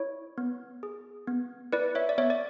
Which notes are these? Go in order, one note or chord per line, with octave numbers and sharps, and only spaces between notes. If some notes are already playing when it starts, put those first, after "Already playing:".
Already playing: E4 C#5
B3
G#4
B3
E4 B4 D5
C#5 E5
D5
B3 C#5 E5
D5